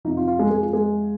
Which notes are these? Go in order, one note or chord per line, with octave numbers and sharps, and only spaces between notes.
F2 C3 F3 D#4
F4
F4
G#3 G#4
G#3 G#4
F4
G#3 G#4